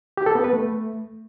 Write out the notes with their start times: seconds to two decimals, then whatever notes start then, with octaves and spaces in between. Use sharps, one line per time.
0.17 G4
0.26 A4
0.35 B3
0.44 B4
0.53 A3